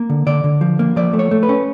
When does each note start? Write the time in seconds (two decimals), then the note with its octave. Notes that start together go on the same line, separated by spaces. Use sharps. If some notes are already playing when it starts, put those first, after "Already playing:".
Already playing: A#3
0.10 D3
0.26 D3 D5
0.44 D3
0.61 F3
0.79 A#3
0.96 F3 D5
1.13 A3
1.19 C#5
1.31 A3
1.43 B4
1.49 C#4